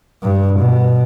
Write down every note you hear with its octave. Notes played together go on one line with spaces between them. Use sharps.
G2
B2